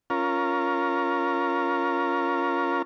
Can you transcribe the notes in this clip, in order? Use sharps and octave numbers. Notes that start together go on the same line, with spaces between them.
C#4 F4 A#4